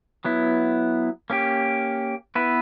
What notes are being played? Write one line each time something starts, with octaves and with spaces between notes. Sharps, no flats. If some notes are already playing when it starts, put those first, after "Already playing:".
F#3 B3 E4
A#3 C#4 G4
B3 E4 B4